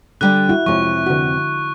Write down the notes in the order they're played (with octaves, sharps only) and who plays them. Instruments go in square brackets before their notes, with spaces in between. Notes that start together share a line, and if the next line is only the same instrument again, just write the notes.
[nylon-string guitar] D3 G3 D5 [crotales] F#6
[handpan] E4 [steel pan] F#4
[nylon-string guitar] F2 C3 [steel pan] F3 G#3 C#5 [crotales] C#6
[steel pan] D3 F#4